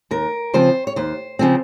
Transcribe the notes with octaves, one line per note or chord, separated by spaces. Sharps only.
D#2 A#4
C#3 F3 C4 C5
C#5
D#2 C5
C#3 F3 C4